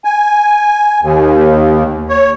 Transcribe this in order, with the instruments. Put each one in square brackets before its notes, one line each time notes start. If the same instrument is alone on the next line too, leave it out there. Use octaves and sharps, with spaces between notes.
[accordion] G#5
D#2
C#5